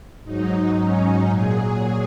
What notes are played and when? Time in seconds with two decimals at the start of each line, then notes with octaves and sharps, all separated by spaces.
0.24 G#2 F#3 D#4
0.76 C#4
1.28 A#2 F#3 G#4